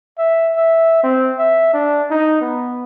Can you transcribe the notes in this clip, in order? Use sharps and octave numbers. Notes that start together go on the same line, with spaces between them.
E5
E5
C4
E5
D4
D#4
B3